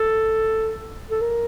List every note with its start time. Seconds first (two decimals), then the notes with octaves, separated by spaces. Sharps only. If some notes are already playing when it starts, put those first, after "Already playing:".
Already playing: A4
1.11 A4
1.21 A#4